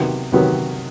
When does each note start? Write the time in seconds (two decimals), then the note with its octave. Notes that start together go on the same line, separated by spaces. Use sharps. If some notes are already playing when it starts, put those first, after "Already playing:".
Already playing: C3 D#3 F#3 B3
0.32 C3 D#3 F#3 B3